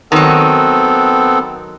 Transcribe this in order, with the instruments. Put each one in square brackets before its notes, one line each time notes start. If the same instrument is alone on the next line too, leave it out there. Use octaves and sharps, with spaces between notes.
[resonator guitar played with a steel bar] D#3 F#3 [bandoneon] B3 C4 A4